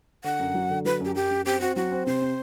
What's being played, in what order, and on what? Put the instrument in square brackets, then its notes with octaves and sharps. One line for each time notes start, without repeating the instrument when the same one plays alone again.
[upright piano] D3 [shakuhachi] F#5
[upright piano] F#2
F#3
D3
[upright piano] F#3 [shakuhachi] B4
[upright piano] F#2 [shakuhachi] G4
[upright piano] F#2 [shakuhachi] G4
[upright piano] F#2
[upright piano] C4 [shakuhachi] G4
[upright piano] C4 [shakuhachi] F#4
[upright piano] F#3 [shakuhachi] F#4
[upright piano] C4
[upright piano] C3 [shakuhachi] C5
[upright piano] C4